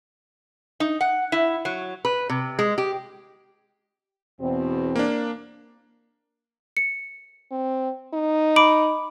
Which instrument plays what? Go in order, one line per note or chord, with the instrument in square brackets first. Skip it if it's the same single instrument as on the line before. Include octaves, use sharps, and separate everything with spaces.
[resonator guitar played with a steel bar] D#4
F#5
E4
F#3
B4
C3
G#3
G4
[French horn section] E2 B2 C4
[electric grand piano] A#3 D4
[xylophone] C#7
[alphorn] C4
D#4
[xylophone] B5 D6 D7